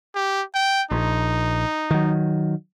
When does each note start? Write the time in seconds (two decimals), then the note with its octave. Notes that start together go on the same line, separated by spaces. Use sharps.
0.16 G4
0.55 G5
0.91 A#1 D#4
1.91 D#3 F#3